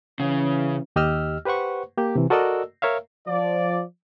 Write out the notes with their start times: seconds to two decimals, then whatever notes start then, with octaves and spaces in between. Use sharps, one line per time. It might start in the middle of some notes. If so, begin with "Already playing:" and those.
0.20 C#3 E3 C#4
0.96 D#2 G4 D#5 E6 F6
1.45 G4 B4 C5 F#5 C#6
1.97 A#3 G4
2.16 C3 E3
2.30 F#4 A4 A#4 D5 D#5 E6
2.82 A#4 C#5 E5 F5
3.28 F3 D5